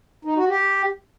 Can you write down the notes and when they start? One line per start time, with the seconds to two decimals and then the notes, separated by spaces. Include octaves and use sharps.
0.25 D#4
0.36 F#4
0.48 G4